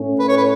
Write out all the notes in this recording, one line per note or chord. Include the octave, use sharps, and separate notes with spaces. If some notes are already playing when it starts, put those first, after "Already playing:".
Already playing: A2 A3 C#4
B4
C#5
B4